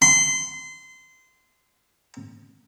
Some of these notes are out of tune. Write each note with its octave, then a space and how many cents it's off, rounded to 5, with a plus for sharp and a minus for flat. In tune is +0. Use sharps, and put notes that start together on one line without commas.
C6 -25